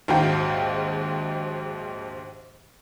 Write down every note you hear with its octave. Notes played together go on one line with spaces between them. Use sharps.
A#1 D#2 G#2 F#4 F5 G5